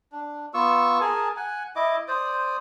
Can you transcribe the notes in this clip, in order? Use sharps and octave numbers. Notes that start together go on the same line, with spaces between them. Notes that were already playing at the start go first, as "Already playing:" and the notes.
D4
B3 F4 C#6 E6
G#4 A#4 G#5 A5
F#5 G#5
E4 D#5 D6
C5 D5 D#6